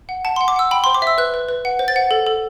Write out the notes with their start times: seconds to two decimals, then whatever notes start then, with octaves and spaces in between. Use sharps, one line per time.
0.09 F#5
0.25 F#5 A5
0.36 C6
0.41 F#5
0.48 D6
0.56 F#5 E6
0.71 G5 B5
0.84 C5 C6
0.94 D6
1.02 E5 E6
1.18 B4 F#6
1.34 B4
1.49 B4
1.65 F#5
1.79 C5
1.88 A6
1.96 F#5
2.11 A4
2.26 A4